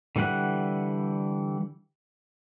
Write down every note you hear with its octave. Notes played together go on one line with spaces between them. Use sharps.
D3 E3 G3 F#5 F#6